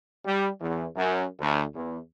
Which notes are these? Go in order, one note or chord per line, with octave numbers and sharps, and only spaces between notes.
G3
E2
F#2
D2
E2